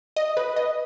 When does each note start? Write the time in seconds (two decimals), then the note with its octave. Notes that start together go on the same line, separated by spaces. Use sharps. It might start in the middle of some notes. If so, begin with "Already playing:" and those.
0.16 D#5
0.37 B4
0.56 D#5